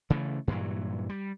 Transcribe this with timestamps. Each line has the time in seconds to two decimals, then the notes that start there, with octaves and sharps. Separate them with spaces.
0.10 C#3 E3 A3
0.48 G2 A#2 E3 F#3
1.09 G3